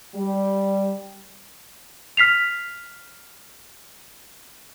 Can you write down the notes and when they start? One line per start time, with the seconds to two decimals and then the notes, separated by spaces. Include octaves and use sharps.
0.14 G3
2.17 F6 B6 C7 F7